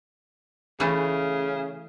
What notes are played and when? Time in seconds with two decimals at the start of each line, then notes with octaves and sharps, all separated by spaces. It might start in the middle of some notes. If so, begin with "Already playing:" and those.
0.80 C#3 E3 A3 C#4